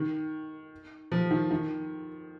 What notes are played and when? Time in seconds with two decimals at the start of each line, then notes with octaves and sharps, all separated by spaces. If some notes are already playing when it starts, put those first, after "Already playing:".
Already playing: D#3
1.12 F3
1.31 D#3
1.51 D#3